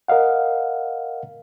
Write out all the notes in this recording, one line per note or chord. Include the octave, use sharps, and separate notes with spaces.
A#4 D#5 F5 F#5